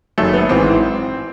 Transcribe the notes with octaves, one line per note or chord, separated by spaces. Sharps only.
F#1 F#2 D#3 A3
B3
A1 G#2 E3 C4